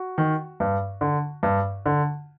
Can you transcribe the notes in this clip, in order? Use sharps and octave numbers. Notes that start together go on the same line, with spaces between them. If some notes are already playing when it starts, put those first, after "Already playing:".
Already playing: F#4
D#3
G2
D3
G2
D3